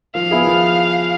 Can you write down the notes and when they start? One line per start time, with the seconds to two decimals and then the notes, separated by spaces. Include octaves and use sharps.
0.15 F3 F5
0.31 B3 E4 G#4
0.47 F3